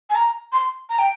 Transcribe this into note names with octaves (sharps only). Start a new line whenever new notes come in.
G#5
A#5
C6
A#5
G5